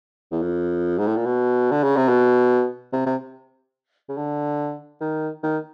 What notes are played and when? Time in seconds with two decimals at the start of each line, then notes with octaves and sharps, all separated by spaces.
0.32 E2
0.42 F2
0.98 G#2
1.07 A2
1.17 A#2
1.26 B2
1.72 D3
1.84 C#3
1.97 C3
2.09 B2
2.93 C3
3.06 C3
4.09 C#3
4.17 D3
5.01 D#3
5.43 D#3